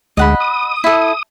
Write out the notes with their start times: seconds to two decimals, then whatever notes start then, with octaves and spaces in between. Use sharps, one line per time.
0.17 D2 G#3 D#5 F#5 B5
0.40 D#6
0.84 E4 A4